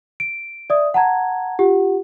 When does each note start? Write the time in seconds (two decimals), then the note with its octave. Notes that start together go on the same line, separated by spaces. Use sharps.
0.20 D7
0.70 D5 E5 D#6
0.94 F#5 A5 A#5 G#6
1.59 F4 G4 F#5